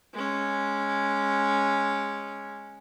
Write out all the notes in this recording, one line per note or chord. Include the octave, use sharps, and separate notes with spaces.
G#3 C#4